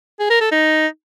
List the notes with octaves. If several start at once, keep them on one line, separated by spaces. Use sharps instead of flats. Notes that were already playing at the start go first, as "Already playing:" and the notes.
G#4
A#4
A4
D#4